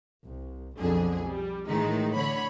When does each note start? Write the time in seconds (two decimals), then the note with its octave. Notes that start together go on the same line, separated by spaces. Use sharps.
0.24 C2
0.78 B1 F2 D3 G#4
1.28 G3
1.68 A2 D#3 E3 G#3 D#4
2.16 D3 C#5 B5